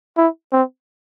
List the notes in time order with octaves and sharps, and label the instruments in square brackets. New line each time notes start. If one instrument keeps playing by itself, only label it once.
[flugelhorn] E4
C4